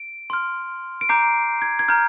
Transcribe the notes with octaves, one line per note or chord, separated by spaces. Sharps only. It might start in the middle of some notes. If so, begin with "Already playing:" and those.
Already playing: D7
C6 F6
D7
A#5 D6 G6 C7
G#6
G#6
A#5 F6 G6